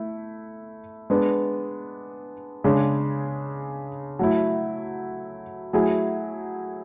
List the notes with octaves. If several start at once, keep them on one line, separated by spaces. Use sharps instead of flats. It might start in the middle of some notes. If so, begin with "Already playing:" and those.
Already playing: A3 E4
G#3 B3 D4
C#3 G#3 D4 G#4
F#3 A3 E4
F#3 A3 E4 G#4